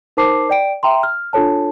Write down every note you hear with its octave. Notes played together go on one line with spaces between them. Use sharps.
D#4 A#4 C5 A5 D6 C7
D5 G5 D7
E5 G5 A#5 C6
F6
D4 F4 A4 C#5 A5